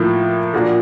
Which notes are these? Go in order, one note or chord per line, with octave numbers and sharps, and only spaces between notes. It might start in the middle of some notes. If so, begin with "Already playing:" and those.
Already playing: A2 F3 A#3
A#2 F3 A#3 D4 F#4